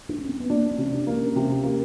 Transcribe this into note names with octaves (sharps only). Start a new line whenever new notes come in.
D4
C#4
C4
B3
A#3 D4
C#4
C3
D4
A#3
C#4
C3 C#4
A#3